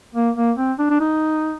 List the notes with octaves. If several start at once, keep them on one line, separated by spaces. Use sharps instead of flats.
A#3
A#3
C4
D4
D4
D#4